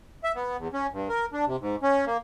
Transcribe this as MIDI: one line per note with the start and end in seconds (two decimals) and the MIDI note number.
0.24 0.32 76
0.35 0.57 59
0.59 0.68 40
0.73 0.87 61
0.93 1.09 43
1.09 1.26 70
1.33 1.45 62
1.47 1.56 48
1.61 1.76 44
1.83 2.05 61
2.07 2.17 58